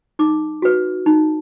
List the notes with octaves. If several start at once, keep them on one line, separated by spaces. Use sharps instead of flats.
D#4 D6
F#4 B4
D#4